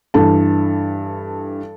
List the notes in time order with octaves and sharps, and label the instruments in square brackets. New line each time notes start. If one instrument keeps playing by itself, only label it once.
[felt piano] G2 E3 A4 A5